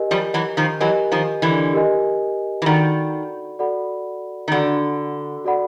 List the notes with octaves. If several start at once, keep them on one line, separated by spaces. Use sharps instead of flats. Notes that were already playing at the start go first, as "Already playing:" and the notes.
Already playing: G4 A#4 D#5 G#5
F3 G3
E3 F#3
D#3 F3
E3 F#3 G4 A#4 D#5 G#5
D#3 F3
D3 E3
G4 A#4 D#5 G#5
E3
D#3 F#4 A4 D5 F#5 B5
F#4 A4 D5 F#5 B5
D#3
D3 F#4 A4 D5 F#5 B5
F#4 A4 D5 F#5 B5